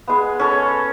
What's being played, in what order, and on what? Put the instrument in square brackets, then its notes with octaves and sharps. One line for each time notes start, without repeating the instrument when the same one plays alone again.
[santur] G#3 B3
C#4 A4 C#5 C#6